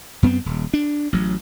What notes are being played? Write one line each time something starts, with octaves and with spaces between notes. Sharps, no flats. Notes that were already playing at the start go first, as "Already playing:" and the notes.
F#2 B3 C4
D#1
D4
A1 F#3